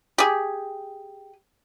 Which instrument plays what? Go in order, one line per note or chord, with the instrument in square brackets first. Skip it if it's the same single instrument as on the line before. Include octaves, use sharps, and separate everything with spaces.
[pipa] G4 G#4